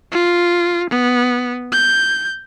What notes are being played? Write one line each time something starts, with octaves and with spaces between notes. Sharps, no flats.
F4
B3
G6